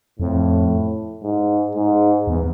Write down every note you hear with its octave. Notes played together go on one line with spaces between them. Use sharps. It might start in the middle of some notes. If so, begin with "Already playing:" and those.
F2 A2
G#2
G#2
E2